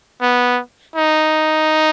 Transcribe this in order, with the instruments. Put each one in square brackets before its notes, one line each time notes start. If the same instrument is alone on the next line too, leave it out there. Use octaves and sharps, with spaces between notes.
[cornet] B3
D#4